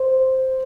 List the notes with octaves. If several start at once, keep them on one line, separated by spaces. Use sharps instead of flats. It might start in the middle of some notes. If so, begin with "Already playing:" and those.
Already playing: C5